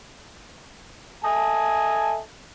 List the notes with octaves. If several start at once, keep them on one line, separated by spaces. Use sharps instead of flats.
A4 D#5 E5 G#5 A5